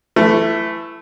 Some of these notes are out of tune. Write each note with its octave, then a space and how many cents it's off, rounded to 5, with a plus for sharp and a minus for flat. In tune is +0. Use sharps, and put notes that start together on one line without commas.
E3 +20 A3 +0